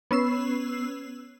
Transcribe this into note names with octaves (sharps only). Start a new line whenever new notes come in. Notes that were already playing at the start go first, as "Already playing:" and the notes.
B3 C#4 E6 C7